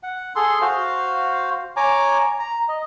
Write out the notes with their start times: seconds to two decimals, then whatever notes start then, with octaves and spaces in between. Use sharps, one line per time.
0.03 F#5
0.36 G#4 A4 C6
0.62 F#4 C5 F5
1.77 C#5 G#5 A#5 D6
2.39 A#5
2.69 D#5